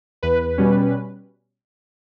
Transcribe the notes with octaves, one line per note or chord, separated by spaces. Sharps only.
E2 B4
B2 G3 C#4